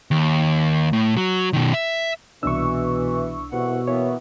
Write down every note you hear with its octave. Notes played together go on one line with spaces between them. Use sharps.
D#2
A2
F#3
B2 D#3
E5
C2 B2 E3 D4 C#6 E6
C2 B2 E3 F#5
E3 A#3 B3 C#5